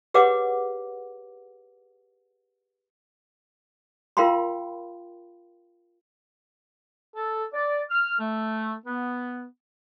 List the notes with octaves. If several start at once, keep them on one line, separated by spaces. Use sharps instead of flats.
G4 G#4 B4 C#5 F#5 D6
F4 A#4 F5 G5 B5 C6
A4
D5
F6
A3
B3